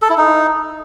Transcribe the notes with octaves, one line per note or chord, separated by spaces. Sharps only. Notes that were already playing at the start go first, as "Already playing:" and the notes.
A4
E4
D#4